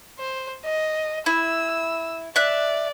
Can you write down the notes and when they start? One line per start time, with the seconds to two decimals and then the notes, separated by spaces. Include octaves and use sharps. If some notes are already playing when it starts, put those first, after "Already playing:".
0.19 C5
0.65 D#5
1.26 E4 E6
2.36 D5 E5 F#6